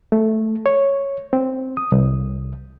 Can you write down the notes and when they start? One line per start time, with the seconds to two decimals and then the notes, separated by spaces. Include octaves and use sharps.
0.12 A3
0.66 C#5
1.33 C4
1.77 D#6
1.92 C2